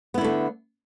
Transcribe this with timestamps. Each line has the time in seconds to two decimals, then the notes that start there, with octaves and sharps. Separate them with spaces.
0.14 B3
0.18 E4
0.21 D3
0.24 A3